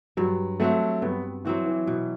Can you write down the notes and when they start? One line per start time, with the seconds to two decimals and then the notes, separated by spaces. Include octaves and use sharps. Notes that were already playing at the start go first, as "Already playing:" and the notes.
0.17 G2 F#3
0.60 F#3 A3 C4 F#4
1.02 G2 B3
1.45 E3 F#3 C4 F#4
1.66 E3
1.87 B2